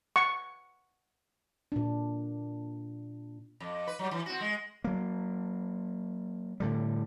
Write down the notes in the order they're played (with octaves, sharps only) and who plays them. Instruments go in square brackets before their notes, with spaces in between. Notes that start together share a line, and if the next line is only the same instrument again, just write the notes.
[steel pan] F#5 C#6
[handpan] A#2 D4
[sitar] F2
B4
F#3 G3
E3
C4 F#4
G#3
[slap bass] F#3 A#3
A2 D3 G3